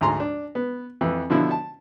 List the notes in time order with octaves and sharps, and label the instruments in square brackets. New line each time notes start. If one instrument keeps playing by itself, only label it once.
[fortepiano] D2 G#2 G#3 A#5 C6
D4
B3
F2 E3
B2 D3 F3 E4
A5